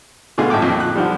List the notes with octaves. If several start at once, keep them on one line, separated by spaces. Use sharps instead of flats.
B2 D3 A3 F4 G#4
G#1 A2 G5 D6
F2 A#2
F#6
D3 F3 G3